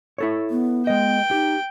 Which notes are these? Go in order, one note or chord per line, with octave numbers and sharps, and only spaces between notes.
E4 A4 C#5
B3
G#3 D#5 G5
D#4 G4